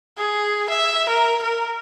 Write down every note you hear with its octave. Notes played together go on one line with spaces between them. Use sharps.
G#4
E5
A#4
A#4